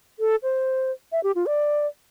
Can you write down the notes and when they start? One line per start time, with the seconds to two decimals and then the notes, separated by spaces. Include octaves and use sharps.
0.20 A4
0.43 C5
1.12 E5
1.24 G4
1.35 F4
1.46 D5